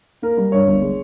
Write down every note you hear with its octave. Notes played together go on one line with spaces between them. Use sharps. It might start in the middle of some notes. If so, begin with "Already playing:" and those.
A#3 A#4
G3
G2 C#5
G1
G#3